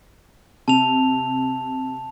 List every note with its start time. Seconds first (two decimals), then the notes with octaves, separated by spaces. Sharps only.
0.68 C3 A5 F7